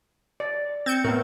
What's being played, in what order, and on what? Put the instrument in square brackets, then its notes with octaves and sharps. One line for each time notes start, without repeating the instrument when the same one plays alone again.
[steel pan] D5
[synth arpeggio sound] C4 G6 C#7
[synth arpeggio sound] A2 [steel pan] B3 A#4